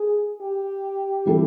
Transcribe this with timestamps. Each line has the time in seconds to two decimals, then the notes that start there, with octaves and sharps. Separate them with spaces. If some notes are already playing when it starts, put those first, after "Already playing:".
Already playing: G#4
0.42 G4
1.25 E3 G3 C4 E4 A4